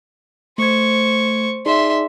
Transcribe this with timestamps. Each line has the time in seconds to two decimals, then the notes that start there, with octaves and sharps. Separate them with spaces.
0.58 A3 C5 C#6 G#6
1.66 D#4 G#4 D5 E5 C6